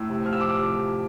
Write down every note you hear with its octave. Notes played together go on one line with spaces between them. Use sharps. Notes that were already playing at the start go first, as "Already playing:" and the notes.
Already playing: A2 E6
C3
F3 F6
E6
F3 D6
C3